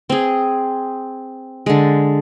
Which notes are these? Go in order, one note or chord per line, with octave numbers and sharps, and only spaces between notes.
C4 G#4
D3 G#3